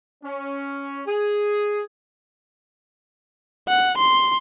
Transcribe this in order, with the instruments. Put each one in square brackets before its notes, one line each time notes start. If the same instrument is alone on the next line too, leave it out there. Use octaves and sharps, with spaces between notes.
[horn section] C#4
G#4
[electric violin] F#5
C6